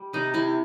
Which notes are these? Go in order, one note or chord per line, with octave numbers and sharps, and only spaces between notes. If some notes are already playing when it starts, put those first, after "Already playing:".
Already playing: G3
C3 D#4
C3 E4